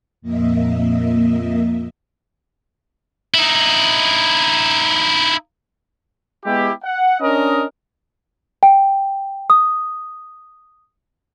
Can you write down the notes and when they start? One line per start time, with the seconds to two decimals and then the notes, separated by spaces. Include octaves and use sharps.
0.22 F2 A#2 A#3 D#5 E5
3.34 D#4 E4
6.45 G#3 B3 E4 G4
6.84 F#5
7.20 C#4 D4 A#4 D#5
8.63 G5
9.50 D#6